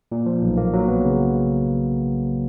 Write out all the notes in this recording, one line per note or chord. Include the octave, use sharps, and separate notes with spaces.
A#2
F3
B1
A#3
F#3
B3
C#3